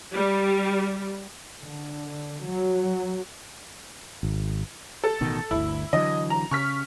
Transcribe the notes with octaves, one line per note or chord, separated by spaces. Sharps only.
G3
D3
F#3
G#1
A4
A1 B2 D#3
G1 D2 E4
D3 E3 F#3 D#5
A#5
C#3 C#6 F6 B6